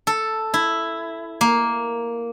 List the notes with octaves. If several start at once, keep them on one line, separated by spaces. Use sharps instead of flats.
A4
E4
A#3